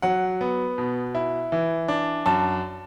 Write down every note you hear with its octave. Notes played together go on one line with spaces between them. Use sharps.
F#3 F#5
B3
B2
E4
E3
D4
F#2 A5